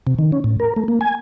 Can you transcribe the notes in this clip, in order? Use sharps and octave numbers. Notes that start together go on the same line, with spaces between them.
C3
D#3
C#4
A2
A#4
A3
A#3
G#5